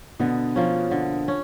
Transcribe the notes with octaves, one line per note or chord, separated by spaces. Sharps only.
B2 D3 B3
F3 A#3 C#4
D3
C#4